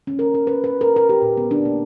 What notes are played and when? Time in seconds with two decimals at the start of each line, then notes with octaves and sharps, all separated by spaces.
0.07 C#4
0.19 A#4
0.34 A#4
0.47 B4
0.64 B4
0.81 A#4
0.96 A#4
1.09 G4
1.22 A#2
1.37 B3
1.51 D4
1.65 A#3